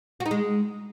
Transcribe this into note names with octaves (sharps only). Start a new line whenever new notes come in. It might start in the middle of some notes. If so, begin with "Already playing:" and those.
F#4
D#4
G#3